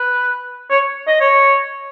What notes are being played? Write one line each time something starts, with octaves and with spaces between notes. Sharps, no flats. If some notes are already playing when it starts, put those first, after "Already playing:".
Already playing: B4
C#5
D#5
C#5